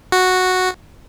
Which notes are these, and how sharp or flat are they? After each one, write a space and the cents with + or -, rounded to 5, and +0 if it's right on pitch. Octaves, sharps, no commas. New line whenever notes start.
F#4 -5